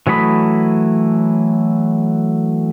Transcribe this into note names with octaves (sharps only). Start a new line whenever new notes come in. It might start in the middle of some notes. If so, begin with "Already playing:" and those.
E3 F#3 A3 B5 D#6